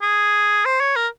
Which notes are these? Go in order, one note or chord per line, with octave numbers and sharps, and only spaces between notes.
G#4
C5
C#5
A#4